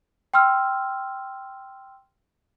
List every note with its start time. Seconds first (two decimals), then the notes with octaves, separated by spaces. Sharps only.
0.34 G5 C6 E6 F6